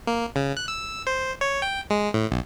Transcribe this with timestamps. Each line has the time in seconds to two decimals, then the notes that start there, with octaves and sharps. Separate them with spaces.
0.07 A#3
0.36 C#3
0.57 F#6
0.68 E6
1.07 C5
1.41 C#5
1.62 G5
1.90 G#3
2.14 A2
2.31 B1